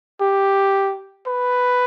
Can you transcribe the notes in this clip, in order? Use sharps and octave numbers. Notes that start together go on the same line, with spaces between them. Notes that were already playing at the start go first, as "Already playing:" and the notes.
G4
B4